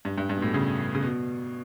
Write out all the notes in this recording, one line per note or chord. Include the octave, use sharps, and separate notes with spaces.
G2
G2
G2
B2
A2
C#3
C#3
B2